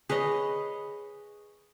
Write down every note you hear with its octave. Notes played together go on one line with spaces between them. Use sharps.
G#4 B4 C#5 D#5